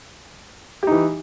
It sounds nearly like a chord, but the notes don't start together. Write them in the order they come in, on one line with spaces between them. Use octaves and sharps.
G4 D#4 E3